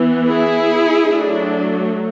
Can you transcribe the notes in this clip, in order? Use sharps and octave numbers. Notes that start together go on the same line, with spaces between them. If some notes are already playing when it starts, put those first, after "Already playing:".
Already playing: E3 B3
E4 G#4
F#3 A3 D4